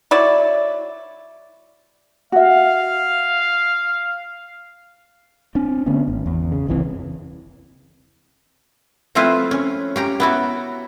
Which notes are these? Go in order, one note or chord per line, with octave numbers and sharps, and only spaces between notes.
F#3 E4 D5
F#4 E5 F5
C4 D4
D3 A3 B3 C#4
G#1
E2
C#3
F#1 C2 E3 C4
F3 A3 C4 E4 F4 B4
C#4
C#4 G4 A#5
B3 E4 F#4